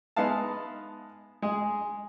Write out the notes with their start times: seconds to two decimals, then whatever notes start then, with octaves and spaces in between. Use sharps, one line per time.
0.16 G#3 B3 D#4 E5 F5 A5
1.42 G#3 G#4